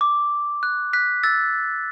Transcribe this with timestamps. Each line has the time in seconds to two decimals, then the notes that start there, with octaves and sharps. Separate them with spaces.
0.01 D6
0.63 F#6
0.93 F#6 B6
1.23 E6 A6